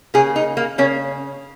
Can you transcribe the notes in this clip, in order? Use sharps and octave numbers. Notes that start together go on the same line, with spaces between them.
C#3 A#3 G#4
D#4
A#3
C#3 A#3 C#4